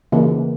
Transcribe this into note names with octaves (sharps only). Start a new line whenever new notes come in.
C#3 E3 A#3